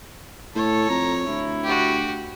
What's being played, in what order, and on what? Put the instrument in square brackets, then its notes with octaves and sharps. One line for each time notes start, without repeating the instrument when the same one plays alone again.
[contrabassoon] A2 [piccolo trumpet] A4 [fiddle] C#5
[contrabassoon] F2 [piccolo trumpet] A#5
[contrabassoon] D2 [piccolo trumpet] E4
[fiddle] F#4 G4